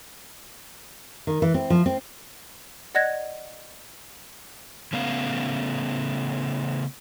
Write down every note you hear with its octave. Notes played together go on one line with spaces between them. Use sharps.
D#3
E3
C4
F3
C4
D5 D#5 F#5 F#6 G#6 A#6
C#3 A3 B3 F5